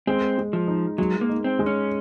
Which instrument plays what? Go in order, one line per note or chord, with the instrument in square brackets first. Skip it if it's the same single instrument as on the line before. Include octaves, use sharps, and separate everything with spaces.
[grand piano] G#3 [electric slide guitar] C4
[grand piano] G#3
[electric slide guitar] F3
[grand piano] D#4
[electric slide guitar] F#3 [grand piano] G#3
[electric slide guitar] A#3
[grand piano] D#4
[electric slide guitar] C4
[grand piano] G#3
[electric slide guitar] C#4